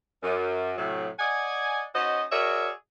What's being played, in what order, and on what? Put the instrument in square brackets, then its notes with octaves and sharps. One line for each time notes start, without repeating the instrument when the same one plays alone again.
[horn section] F#2
A2 C3 F#3
D5 D#5 F#5 G#5
C#4 D#4 F#4 C5 D#5
F#4 G#4 A#4 C#5 D5 E5